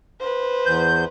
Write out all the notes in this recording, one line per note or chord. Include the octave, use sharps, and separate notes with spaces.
B4 C5
E2 G6